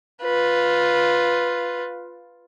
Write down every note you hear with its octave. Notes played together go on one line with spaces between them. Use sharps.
F4 B4